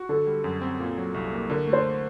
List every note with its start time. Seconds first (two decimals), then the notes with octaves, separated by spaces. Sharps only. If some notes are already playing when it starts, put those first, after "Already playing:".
Already playing: F#4
0.09 D3 A4
0.27 G3
0.44 F#2
0.61 C4
0.80 A#2
0.98 F#3
1.14 C2
1.32 A#3
1.50 D3 A#4
1.67 A3
1.73 C5